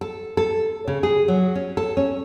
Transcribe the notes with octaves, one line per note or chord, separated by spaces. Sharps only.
A4
A4
C#3
G#4
F#3
C#4
A4
C#4